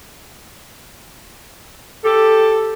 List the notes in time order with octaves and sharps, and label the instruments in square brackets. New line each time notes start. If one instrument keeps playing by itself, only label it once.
[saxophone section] G4 A4